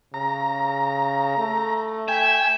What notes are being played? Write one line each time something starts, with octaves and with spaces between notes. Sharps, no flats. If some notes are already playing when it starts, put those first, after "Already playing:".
C#3 A#5
A3
E5 G5 G#5